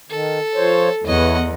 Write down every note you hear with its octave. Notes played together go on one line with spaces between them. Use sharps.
D#3 A4
F3 C5 C#5
E2 B4 C#5 D#5 F#5